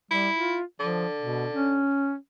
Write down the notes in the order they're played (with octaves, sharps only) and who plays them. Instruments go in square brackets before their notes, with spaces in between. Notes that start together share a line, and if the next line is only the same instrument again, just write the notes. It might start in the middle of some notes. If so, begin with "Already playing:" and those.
[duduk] G3 [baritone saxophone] E4
[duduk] F4
[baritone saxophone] D3 [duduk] F3
[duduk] B2
C#4